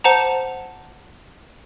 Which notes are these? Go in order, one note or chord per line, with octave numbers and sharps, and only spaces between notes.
C5 F#5 A5 A#5